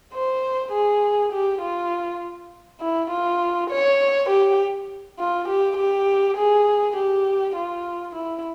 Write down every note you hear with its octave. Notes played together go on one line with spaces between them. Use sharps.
C5
G#4
G4
F4
E4
F4
C#5
G4
F4
G4
G4
G#4
G4
F4
E4